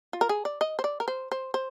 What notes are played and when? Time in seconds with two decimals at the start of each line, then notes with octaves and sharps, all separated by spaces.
0.13 F4
0.21 A#4
0.29 G#4
0.45 D5
0.61 D#5
0.79 C5
0.84 D5
1.00 A#4
1.08 C5
1.32 C5
1.54 C5